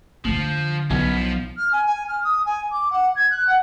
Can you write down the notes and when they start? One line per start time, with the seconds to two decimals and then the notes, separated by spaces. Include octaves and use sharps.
0.25 F2 D3 F3
0.90 B1 B3 C#4
1.15 F3
1.57 F6
1.72 G#5
1.86 G#5
2.08 F6
2.23 D#6
2.45 G#5
2.71 D6
2.90 F#5
3.15 G#6
3.30 F#6
3.46 F#5